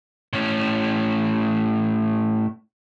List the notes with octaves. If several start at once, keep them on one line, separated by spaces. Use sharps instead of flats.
A2 C#4